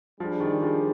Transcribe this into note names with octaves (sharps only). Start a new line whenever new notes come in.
F3 G3 D4 G#4
D#3
F3